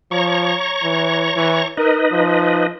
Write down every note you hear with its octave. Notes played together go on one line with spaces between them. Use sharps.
F3 C#5 A#5 C#6
E3
E3
D#4 A#4 B4 D#5
F3